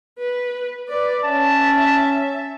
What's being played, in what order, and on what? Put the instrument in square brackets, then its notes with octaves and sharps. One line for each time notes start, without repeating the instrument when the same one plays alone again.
[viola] B4
B4 D5
[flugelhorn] C#4 [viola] E5 [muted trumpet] A5